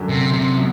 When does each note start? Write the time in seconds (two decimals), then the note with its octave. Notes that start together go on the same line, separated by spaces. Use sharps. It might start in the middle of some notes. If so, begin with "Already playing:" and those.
Already playing: F#2 D3 F#3
0.09 C3
0.34 C3
0.57 F#3